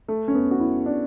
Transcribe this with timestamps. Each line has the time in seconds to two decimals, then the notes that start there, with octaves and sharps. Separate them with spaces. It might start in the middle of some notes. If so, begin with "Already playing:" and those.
0.08 A3
0.28 C#4
0.35 B3
0.51 F#4
0.60 E4
0.86 D4